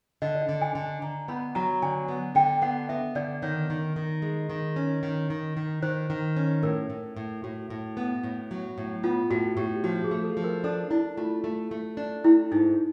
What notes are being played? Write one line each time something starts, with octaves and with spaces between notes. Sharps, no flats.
D3 D#5
D5
D#5
D3
G#5
D3
D3 A#5
B3 B5
F#3 A#5
D3 G#5
B3
D3 G5
B3 F#5
B3 E5
D3 D5
D#3 C#5
D#3
D#3
G#3
D#3
C#4
D#3
D#3
D#3
D#3 C5
D#3
C#4
A2 A#4
A2
A2
A2 F#4
A2
B3
A2
F#3
A2
B3 F4
A2 F#4
A2 G4
F3 F#4
G#4
A3
A4
F3
A#4
D4 A4
D4 E4
A3 F4
A3
A3
D4
A3 E4
G#2 D#4